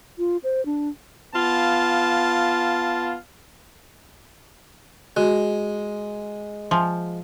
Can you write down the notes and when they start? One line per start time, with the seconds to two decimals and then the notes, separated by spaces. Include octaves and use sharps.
0.18 F4
0.44 C5
0.66 D4
1.35 B3 F4 F5 A5
5.17 G#3 F#4
6.71 F3 E5 G#5 C6